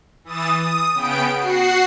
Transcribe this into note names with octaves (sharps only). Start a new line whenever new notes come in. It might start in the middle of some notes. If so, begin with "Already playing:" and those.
E3 D#6 A6 E7
D#6
C#3 B3 G5 D7
F#4 F#5 C7